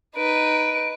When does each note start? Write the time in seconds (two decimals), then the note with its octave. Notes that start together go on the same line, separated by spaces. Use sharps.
0.16 D#4 B4 D7